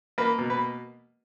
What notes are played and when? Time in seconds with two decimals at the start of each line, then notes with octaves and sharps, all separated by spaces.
0.18 A#3 B4
0.38 B2
0.50 B4